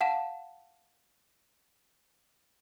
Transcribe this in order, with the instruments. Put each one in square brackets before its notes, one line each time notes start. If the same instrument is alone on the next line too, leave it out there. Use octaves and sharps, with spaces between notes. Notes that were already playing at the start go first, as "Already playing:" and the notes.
[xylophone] F5 F#5 A5 E7